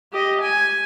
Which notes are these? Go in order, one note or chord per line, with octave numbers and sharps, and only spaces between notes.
G4 D#5
G#5